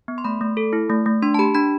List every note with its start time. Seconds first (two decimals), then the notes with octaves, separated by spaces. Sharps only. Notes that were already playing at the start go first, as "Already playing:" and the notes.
0.08 B3
0.18 C6
0.24 A3 B5
0.41 A3
0.57 A4
0.73 E4
0.90 A3
1.06 A3
1.22 D4 C6
1.34 A5
1.39 G4 B5
1.55 D4 B5